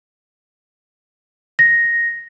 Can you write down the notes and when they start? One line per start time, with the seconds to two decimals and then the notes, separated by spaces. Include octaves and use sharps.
1.59 A#6